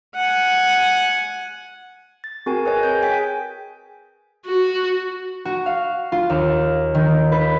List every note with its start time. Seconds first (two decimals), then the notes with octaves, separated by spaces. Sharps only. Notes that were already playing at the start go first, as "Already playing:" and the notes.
0.15 F#5 G#5
2.24 A6
2.46 C4 F#4 G#4 A#4 G#5
2.65 G#4 A#4 B4 C#5 D#5 G#5
2.83 G#4 G6
3.02 G5 G#5 B6
4.46 F#4
5.45 F#4
5.66 F5
6.12 F4
6.30 D#2
6.95 D#3
7.32 B4